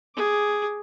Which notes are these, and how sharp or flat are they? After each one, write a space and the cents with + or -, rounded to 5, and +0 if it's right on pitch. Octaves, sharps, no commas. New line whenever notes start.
G#4 +0 D6 +0